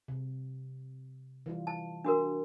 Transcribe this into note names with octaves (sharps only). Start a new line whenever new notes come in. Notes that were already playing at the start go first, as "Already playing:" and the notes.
C3
E3 G3 F4
A5
D4 F#4 A#4